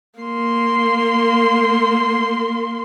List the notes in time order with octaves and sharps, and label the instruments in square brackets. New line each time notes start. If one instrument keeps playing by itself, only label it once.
[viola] A#3 C6